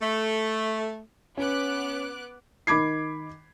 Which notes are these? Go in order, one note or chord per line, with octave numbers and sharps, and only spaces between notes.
A3
B3 C#4 D6 F#6
D#3 B5 D6 G#6 C7